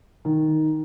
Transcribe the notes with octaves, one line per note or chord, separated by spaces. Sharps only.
D#3